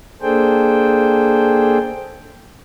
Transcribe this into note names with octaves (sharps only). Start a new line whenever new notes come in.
A#3 D4 G#4 A4 C5 G5